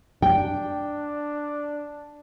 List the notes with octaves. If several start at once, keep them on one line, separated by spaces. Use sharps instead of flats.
D4 G5